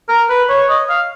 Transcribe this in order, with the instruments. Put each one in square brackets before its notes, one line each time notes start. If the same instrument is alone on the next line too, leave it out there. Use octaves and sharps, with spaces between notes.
[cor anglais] A#4
B4
C#5
D#5
F5